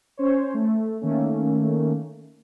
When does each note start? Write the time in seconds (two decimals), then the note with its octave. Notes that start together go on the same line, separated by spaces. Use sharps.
0.17 C#4 C5 C#5
0.54 A3
1.02 D#3 A3 A#3 C#4